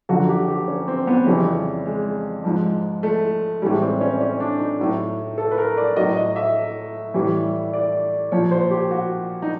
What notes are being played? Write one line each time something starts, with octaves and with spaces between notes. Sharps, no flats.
F#2 D3 F3 F#4
G4
G4
C#4
C4
B3
F2 C#3 E3 G3 C#4
G#3
G#2 F3
A3
A2 E3 G3 G#3
C4
C#4
C#4
D4
D#4
A2 F#3
A4
B4
A#4
D5
A2 F#3 D#5
D#5
E5
A2 E3 G3
D5
A#2 F3 C#5
C5
G4
F#4
D#4